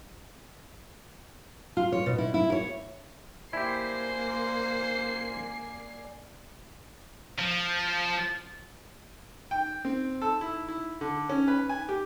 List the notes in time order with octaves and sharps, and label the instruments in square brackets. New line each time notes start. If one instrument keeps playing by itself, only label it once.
[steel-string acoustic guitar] F4
C#5
B2
E4
E4
C#5
[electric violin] A#3 C7 [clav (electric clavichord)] E4 G4 [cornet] C5 [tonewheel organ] D5 G#5
[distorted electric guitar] F3
[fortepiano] G5
C4
A4
E4
E4
D3
C#4
B4
G#5
G4